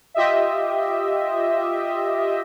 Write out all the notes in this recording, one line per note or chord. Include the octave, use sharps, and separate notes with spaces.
F4 G4 D#5 E5